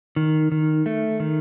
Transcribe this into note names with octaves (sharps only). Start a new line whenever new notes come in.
D#3
D#3
A3
D#3